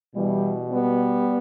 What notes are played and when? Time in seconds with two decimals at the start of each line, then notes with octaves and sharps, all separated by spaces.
0.15 B2 E3 G3
0.70 G3 B3